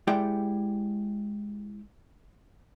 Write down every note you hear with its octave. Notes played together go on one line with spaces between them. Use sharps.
G#3 E4 G4 D5 F#5 G5